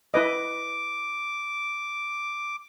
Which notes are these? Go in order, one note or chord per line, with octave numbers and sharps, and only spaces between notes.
E4 B4 D#5 D6